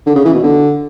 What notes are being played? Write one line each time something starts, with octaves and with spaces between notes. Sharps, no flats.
D3
C#3
E3
B2
D3